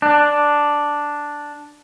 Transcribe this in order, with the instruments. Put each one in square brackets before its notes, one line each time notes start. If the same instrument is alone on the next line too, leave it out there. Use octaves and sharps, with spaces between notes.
[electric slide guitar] D4